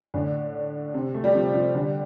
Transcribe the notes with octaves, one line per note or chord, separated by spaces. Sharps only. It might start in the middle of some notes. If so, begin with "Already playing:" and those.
A2 D3
C3
A3
G3
C3 F3
C3 F3
D3 G3